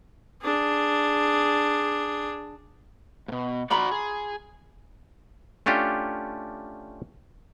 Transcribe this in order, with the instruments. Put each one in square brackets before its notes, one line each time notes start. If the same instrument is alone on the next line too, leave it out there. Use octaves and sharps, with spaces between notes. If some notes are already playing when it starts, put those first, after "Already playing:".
[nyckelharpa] D4 G#4
[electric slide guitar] G#2 B2
[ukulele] F4 A#5 B5 [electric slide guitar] F#4 D5
[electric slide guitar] G#4
[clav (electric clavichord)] A3 C#4 D4 F4 G4